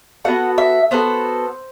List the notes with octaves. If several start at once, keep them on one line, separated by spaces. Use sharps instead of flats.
B3 F#4 A4 F#5
E5
B3 F#4 A4 C5